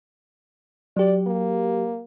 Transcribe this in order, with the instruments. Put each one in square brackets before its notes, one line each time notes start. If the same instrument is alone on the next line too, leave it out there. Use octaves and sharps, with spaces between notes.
[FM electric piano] F#3 G4 [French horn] D5
[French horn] A#3